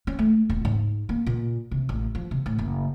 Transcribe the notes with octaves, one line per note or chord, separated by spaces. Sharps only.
C#4
A3
D#1
G#2
A#3
A#2
C3
A1
F3
C3
A2
F#1